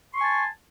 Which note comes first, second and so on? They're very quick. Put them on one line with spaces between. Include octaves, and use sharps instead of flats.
C6 C#6 G#5 A5